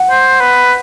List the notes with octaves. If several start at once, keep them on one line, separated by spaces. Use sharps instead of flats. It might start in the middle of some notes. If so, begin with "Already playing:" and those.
Already playing: F#5
C5
B4